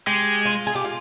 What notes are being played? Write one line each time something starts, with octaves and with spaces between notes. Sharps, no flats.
G#3 G4
F4
G#4
G4
F4